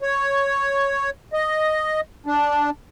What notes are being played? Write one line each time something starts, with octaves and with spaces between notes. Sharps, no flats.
C#5
D#5
D4